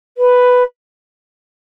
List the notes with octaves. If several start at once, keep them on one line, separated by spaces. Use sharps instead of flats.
B4